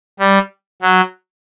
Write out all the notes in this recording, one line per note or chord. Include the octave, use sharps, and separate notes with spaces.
G3
F#3